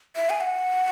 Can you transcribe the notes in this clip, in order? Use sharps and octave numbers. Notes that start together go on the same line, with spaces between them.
E5
G#5
F#5